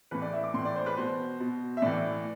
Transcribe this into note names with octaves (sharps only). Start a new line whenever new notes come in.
A2 E3 B4
D5
E5
D6
A2 E3 C6
D5
C5
B4
B2 C5
B2
E5
A2 E3 D5